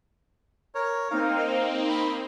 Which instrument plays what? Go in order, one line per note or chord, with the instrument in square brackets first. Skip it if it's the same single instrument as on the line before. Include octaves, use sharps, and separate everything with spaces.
[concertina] A#4 C#5
[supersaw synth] A#3 C4 D#4 [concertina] A#4 F5
[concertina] B5